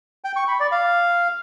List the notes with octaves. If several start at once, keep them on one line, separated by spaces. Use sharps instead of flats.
G5
C#6
B5
D5
F5